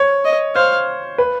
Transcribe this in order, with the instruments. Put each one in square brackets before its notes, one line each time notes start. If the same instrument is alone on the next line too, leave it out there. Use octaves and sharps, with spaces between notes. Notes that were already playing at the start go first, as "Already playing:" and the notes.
Already playing: [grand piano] C#5
[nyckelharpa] D#5
[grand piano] C5 [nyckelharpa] F5
[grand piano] B4